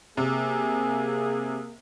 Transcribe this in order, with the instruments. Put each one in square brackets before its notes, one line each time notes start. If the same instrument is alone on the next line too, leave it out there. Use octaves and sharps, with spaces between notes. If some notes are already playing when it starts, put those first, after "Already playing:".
[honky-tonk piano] C3 [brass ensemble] A#3 G#4